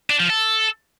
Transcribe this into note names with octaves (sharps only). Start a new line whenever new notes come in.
D4
F3
A4